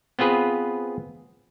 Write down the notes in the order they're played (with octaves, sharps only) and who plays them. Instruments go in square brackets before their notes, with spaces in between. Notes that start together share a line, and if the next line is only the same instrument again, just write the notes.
[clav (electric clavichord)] B3 C4 F4 G#4 B4